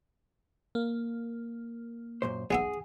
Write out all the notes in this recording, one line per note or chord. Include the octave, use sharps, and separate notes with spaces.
A#3
F#2 A#2 C5
B1 B3 G#4 E5